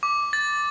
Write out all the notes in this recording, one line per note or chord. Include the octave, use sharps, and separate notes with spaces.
D6
A6